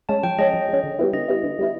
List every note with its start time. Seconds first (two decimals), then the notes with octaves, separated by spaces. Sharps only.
0.09 G#3 C#4 A5
0.23 F3 G5
0.39 G#3 C#4 D#5
0.54 F3
0.68 G#3 C#4
0.84 D3
0.99 G3 B3 E4
1.13 D3 D#5
1.28 G3 B3 E4
1.43 D3
1.59 G3 B3 E4